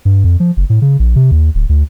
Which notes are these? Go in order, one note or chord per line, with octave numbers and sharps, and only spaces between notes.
G2
F2
F3
F#1
A2
C#3
A#1
C3
D#2
D1
D2